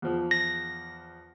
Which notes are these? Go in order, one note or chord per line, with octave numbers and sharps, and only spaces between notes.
E2 F3
A#6